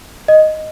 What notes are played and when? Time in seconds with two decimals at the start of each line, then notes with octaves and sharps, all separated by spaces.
0.28 D#5